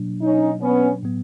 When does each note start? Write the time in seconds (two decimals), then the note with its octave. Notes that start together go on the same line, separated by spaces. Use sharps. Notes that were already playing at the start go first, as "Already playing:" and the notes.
Already playing: B2 F#3 A#3 D4
0.22 C#4 D#4
0.62 B3 C#4
1.03 A2 F#3 B3